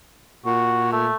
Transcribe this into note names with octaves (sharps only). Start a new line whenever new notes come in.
A#2 F#4
A3